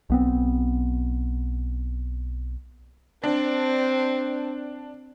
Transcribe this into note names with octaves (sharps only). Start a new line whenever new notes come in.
B1 B3 C4
C4 D4